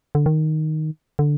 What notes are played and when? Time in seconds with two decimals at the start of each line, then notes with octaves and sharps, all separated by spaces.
0.15 D3
0.26 D#3
1.19 D3